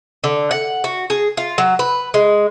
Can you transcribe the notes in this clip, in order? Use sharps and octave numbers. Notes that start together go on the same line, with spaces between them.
D3
F#5
F#4
G#4
F4
F#3
B4
G#3